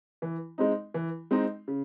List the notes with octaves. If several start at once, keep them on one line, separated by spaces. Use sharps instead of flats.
E3
G#3 C4 D#4
E3
G#3 C4 D#4
C#3